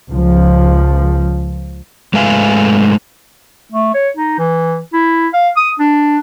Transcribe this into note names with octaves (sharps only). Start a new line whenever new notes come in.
C#2 F3
G#2 G#3 A3 B4 F5 G#5
A3
C#5
D#4
E3
E4
F5
D#6
D4